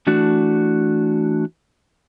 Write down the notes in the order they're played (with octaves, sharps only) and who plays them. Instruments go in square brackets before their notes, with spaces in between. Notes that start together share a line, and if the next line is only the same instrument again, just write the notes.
[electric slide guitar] E3 A3 D4 F#4